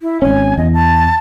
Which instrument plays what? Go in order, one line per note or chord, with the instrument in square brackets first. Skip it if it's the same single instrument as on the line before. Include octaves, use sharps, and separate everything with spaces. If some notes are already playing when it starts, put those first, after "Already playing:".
[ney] E4
[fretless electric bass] G#1 C#4 [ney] G#5
[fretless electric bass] E2 [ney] D#5
[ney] A5